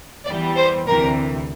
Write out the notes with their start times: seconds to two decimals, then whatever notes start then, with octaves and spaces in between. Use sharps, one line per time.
0.26 E2 E3 G3 D5
0.56 C5
0.87 D2 C3 E3 A#4